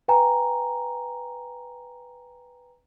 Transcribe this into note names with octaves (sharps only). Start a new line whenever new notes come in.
B4 G5 G#5 A#5